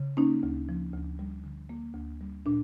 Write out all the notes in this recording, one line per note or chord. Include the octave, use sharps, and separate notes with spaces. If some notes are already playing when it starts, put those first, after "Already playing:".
Already playing: C#3
A#3 C#4 D#4
D2
F3
D2
G3
D3
A#3
D2
G3
A#2 D4